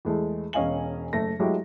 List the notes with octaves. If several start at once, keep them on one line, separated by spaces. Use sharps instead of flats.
E2 G#3 A3
E1 C#4 D#5 F5 G#5 F#7
F#1 A3 A#6
F#3 G#3 A3 E4 F#4 G4